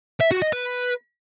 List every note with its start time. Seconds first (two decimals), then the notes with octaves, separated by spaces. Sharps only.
0.21 E5
0.31 F#4
0.42 D#5
0.53 B4